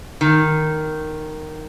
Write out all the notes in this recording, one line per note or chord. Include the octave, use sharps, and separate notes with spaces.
D#3